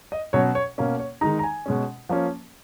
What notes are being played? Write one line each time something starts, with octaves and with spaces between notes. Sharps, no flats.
D#5
B2 F#3 C#4 C#5
C#5
B2 A#3 C#4
C#5
D#3 G#3 D#4 A#5
A#5
G#5
B2 G#3 C#4
F3 A#3 C#4